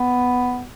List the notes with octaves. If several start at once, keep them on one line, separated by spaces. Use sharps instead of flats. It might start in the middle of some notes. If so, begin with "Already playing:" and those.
Already playing: B3